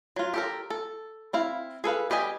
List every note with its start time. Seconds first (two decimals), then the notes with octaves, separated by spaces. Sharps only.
0.16 F#3 F4
0.34 G4 A4 A#4
0.70 A4
1.33 C4 E4 F5
1.84 G#4 A4 B4 F5
2.10 G3 G4 B4 D#5 G#5